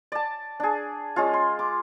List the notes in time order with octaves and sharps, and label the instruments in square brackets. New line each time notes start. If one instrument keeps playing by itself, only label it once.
[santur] D5 A5
D4 G#4
G#3 C#4 F4
C6
D6